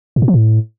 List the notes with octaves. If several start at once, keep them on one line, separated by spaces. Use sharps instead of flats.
A2
A#2
F3
A2